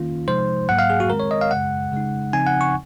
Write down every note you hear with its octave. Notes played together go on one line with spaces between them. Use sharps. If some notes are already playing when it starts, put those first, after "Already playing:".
Already playing: D#3 A#3 C#4 F4
C3 F3 G#3 D#4 C5
G#2 F#3 A#3 F#5
F5
G#4
F#4
D#3 G#3 C4 A#4
C#5
D#5
F5
F#2 C#3 G#3 F#5
C#3 G#3 D#4
C#3 F3 C4 D#4 G#5
F#5
C#6